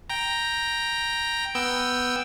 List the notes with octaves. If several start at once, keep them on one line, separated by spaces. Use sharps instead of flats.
G5 A#5
B3 G5 E6